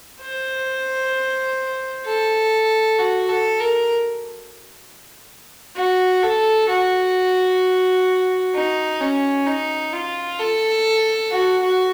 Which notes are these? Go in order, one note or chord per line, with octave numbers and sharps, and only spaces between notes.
C5
A4
F#4
A4
A#4
F#4
A4
F#4
D#4
C#4
D#4
F4
A4
F#4
F#4